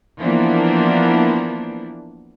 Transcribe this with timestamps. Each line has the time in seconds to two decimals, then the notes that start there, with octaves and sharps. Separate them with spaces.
0.21 E3 F3 A#3 B3 D4